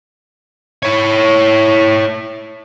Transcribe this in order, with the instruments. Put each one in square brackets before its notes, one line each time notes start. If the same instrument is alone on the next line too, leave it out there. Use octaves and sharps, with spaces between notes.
[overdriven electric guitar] E4 C#5